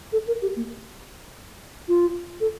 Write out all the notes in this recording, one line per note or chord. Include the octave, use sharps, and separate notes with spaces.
A4
A#4
G4
A#3
F4
A4